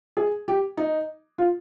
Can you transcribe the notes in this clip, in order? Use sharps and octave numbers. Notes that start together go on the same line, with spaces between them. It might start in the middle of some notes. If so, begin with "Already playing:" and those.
G#4
G4
D#4
F4